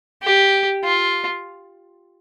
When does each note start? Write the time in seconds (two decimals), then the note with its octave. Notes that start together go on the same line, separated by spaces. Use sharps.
0.23 G4
0.84 F4